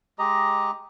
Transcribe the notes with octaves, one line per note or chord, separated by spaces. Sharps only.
G#3 G4 D#5 A#5